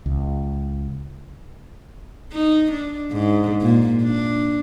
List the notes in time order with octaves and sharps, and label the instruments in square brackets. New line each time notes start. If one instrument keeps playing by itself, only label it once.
[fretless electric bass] C#2
[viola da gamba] D#4
D4
G#2
A#2
D4